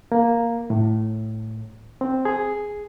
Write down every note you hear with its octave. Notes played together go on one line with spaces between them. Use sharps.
A#3
A2
C4
G#4